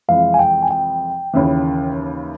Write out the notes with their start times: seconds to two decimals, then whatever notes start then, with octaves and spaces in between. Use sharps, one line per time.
0.08 F2 C3 E3 G#3 F5
0.34 G#5
0.39 G5
0.63 G#5
0.71 G5
1.34 D#2 C#3 E3